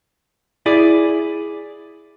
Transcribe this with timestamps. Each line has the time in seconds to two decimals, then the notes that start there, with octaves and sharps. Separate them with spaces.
0.66 E4 G#4 D5